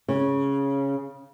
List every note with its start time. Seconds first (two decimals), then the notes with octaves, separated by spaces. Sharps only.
0.08 C#3